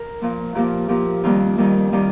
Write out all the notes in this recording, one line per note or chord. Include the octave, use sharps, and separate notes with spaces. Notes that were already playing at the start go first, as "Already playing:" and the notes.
Already playing: A#4
A#2 F3 A#3
A#2 F3 A#3 G4
A#2 F3 A#3 G4
F2 D#3 G3 A#3 F4
F2 D#3 G3 A#3
D#3 G3 A#3 G4